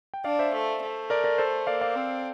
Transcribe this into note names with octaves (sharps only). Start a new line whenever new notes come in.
G5
D4 D5 F5
C5 E5
A3
A3
A#4 D5
A#4 D5
A4 C5
A#3 D5 F5
D5 F5
C4